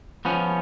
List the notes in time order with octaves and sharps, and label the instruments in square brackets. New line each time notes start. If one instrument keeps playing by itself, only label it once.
[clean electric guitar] F3 B3 C#4